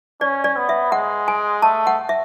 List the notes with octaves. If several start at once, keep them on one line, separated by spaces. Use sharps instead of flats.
C#4 D5
D5
B3
E5
G#3 F#5
G#5
A3 A5
F#5
E5